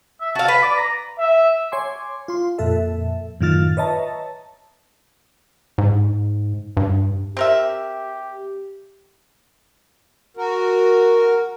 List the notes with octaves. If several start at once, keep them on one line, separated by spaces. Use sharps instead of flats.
E5
F#4 F5 A5
B4 B5
D5
A#5
E5
C#5 G#5 C6 D6
F4 C6
F2 A#2 A4 E5
F#2 A2 D#3 F4 F6 A6
B4 C#5 D#5 E5 A5 A#5
G#2
G2
C4 G4 A#4 E5
F#4 A#4